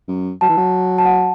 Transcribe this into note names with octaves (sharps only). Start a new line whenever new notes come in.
F#2
F#3 A5
E3
F#3
A5
F#5